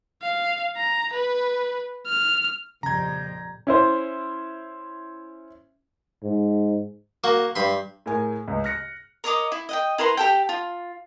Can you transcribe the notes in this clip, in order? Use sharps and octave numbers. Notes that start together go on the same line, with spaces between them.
F5
A#5
B4
F6
A#1 F2 C#3 G3 A#5 G6 G#6
C#4 E4 C5
G#2
A#3 F#4
G2 B5 C6
A2 G#4 A#4 G#5
C#2
F6 F#6 A#6 C#7
A#4 C#5 D#5 D6
E4
D#5 F#5 G5
E4 A#4 B4 C6
G4 A4 G5
F4